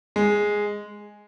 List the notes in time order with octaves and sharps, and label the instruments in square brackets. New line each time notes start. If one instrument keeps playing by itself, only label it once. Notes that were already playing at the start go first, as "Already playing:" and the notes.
[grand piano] G#3